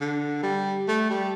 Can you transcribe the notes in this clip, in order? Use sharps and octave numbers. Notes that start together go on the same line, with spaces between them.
D3
G3
A3
G3